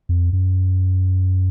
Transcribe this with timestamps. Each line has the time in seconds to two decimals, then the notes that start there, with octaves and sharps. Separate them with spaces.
0.09 F2
0.33 F#2